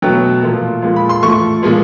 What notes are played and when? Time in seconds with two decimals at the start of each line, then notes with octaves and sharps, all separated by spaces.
0.02 B2 F#3 A3 G5
0.43 A#2 F3 A3
0.82 A#2 F3 G#3
0.96 B5
1.09 C6
1.23 A2 F3 A3 C#6
1.63 A#2 F3 G#3